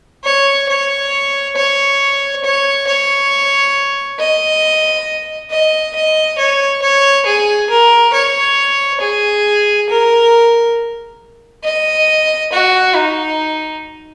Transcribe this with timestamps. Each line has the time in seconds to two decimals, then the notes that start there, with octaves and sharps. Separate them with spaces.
0.24 C#5
0.69 C#5
1.56 C#5
2.44 C#5
2.87 C#5
4.19 D#5
5.51 D#5
5.95 D#5
6.39 C#5
6.82 C#5
7.26 G#4
7.70 A#4
8.13 C#5
9.01 G#4
9.90 A#4
11.64 D#5
12.53 F#4
12.96 D#4